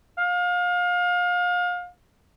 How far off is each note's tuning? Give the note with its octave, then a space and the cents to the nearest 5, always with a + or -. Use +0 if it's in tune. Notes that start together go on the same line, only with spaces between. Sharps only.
F5 +30